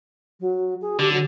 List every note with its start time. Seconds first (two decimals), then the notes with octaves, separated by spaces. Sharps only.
0.40 F#3
0.81 G#4
1.00 D3 G4
1.12 F#3